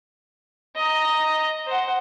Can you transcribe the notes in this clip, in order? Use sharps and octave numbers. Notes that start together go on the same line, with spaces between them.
D#5 A#5
C5 F#5